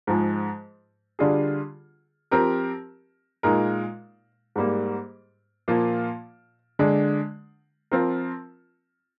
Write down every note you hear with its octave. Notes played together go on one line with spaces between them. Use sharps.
G#2 F3 G#3
D3 G3 D4 F4 G#4
F3 C4 G4 A#4
A#2 G#3 D#4 A#4
G#2 G3 A#3
A#2 F3 A#3 F4
D3 G#3 D4
F3 C4 F4 A#4